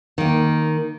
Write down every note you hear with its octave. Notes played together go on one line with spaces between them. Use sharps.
D#3 A#3